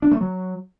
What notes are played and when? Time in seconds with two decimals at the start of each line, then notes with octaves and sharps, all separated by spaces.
0.02 D4
0.12 A3
0.21 F#3